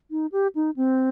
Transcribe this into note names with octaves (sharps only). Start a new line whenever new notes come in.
D#4
G4
D#4
C4